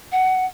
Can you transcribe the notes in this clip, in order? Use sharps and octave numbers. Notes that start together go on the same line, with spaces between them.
F#5